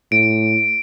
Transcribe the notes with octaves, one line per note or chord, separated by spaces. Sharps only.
A2 D7